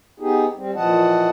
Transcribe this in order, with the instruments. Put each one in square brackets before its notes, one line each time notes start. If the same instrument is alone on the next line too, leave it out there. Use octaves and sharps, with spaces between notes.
[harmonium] B3 D#4 G4 G#4
G3 C4
A#2 E3 F3 D#5 F#5 A5